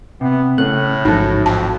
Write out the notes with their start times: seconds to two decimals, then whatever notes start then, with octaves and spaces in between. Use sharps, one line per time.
0.21 C3 B3
0.58 A2 C#3 A3 C#4 F#6
1.05 A1 G#2 F3 D#4 F#4 A4
1.46 F2 A5